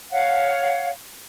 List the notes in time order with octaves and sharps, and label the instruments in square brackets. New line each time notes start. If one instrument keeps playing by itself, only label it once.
[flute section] C#5 F5 F#5